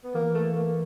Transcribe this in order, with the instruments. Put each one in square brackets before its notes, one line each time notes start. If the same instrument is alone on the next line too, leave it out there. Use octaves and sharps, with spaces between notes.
[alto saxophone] B3
[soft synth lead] E3 [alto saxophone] A#3
[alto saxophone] A3
A#3